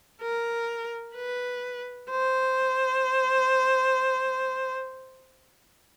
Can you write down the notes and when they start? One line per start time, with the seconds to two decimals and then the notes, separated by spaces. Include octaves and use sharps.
0.22 A#4
1.15 B4
2.10 C5